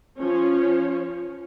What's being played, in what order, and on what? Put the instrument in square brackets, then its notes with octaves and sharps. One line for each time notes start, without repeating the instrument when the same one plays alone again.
[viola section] F3 C#4 C#5